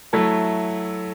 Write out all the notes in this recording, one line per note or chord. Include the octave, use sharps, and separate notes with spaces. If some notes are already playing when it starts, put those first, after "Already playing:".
F#3 A3 E4 A4